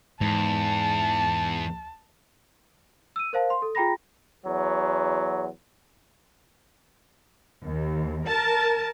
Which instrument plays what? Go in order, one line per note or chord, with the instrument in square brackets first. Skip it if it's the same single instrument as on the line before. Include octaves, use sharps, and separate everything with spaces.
[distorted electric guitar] E2 [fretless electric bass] G#2 [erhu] A5
[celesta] E6 D#7
A#4 C5 F5 A5
C6
A4
F4 G#4 G5 A#5 B5 A#6
[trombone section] E2 F#3
[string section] D#2
A#4 A5